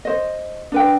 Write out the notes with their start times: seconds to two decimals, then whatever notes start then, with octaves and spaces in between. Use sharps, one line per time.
0.05 C5 D#5
0.72 D4 B4 G5